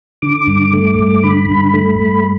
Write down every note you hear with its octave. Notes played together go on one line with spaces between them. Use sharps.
D3 D6
G2
A3
G2
D3 B5
G2
A3
G2